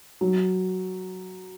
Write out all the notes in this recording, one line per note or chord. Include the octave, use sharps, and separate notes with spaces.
F#3